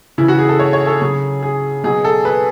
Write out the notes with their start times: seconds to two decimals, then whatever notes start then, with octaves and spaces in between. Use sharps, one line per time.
0.18 C#3 E3 E4
0.28 F#4
0.39 G#4
0.49 A4
0.59 C#5
0.73 C#5
0.87 A4
1.01 C#3 F#3 G#4
1.43 G#4
1.84 B2 F#3 G#4
2.04 A4
2.25 B4